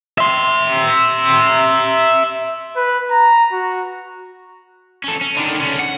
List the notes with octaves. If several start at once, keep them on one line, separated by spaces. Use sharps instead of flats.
E5 C6
B4
A#5
F#4
C#4 A4
C#4
D3 D#3
D3 C#4
F#5